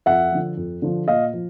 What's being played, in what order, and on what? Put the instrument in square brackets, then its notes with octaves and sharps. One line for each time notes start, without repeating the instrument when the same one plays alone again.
[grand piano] F2 E5 F#5
D3 F3
F2
D3 F3
A#2 D#5 F5
F3